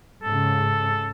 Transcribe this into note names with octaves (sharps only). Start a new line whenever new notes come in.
G#2 C#3 A4